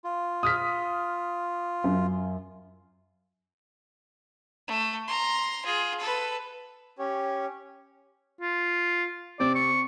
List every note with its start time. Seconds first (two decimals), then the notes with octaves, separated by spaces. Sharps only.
0.04 F4
0.43 D#6 F6 B6
1.84 F#2
4.68 A3
5.08 A#5 C6
5.65 F4 G#4
6.00 A4 B4
6.99 C#4 G4 C#5
8.41 F4
9.39 C3 C4 D5
9.55 C#6